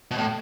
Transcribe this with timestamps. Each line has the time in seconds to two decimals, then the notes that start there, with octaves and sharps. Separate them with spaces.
0.11 B2
0.18 A2